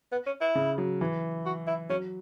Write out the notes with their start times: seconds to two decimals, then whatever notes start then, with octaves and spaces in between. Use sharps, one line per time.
0.12 B3
0.27 C#4
0.41 E4
0.55 C#3
0.78 F#3
1.01 E3
1.46 F#4
1.67 E4
1.90 F#3 C#4